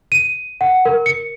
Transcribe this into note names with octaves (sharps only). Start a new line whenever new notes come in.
D#7
F#5
A#4
C#7